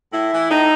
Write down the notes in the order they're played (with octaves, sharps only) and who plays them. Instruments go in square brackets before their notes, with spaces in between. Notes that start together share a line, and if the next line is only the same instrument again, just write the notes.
[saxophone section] A2 E4
E3
A2 D#4